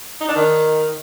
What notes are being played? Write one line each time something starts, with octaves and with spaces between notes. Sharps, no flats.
D#4
D4
D#3